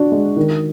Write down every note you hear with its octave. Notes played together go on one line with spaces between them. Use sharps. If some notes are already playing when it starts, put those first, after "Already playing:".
Already playing: D4 F#4
G#3
D#3